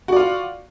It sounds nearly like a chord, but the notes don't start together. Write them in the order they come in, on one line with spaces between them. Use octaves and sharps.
F#4 D5 F4